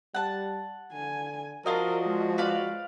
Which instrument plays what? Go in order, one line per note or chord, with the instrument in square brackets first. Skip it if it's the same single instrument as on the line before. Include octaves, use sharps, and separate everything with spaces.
[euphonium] G3 [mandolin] F#5 A5
[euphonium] D3 [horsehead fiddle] G#5
[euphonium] F3 [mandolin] D4 F4 D#5 [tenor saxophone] F#4 [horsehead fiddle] A#4
[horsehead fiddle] G#3
[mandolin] B4 D5 F5